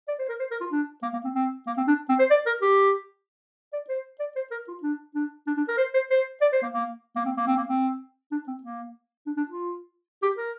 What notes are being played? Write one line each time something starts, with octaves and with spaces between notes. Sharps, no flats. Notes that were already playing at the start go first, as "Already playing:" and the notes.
D5
C5
A#4
C5
A#4
F4
D4
A#3
A#3
C4
C4
A#3
C4
D4
C4
C5
D5
A#4
G4
D5
C5
D5
C5
A#4
F4
D4
D4
D4
D4
A#4
C5
C5
C5
D5
C5
A#3
A#3
A#3
C4
A#3
C4
A#3
C4
D4
C4
A#3
D4
D4
F4
G4
A#4